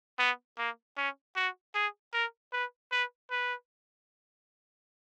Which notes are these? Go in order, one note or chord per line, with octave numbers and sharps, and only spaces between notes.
B3
A#3
C#4
F#4
G#4
A#4
B4
B4
B4